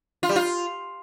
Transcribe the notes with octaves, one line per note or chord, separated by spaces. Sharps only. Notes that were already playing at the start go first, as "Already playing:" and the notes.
F4
G3
F4